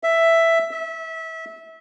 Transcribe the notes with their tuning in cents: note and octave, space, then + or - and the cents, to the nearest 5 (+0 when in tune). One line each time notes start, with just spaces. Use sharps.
E5 +5
E5 -25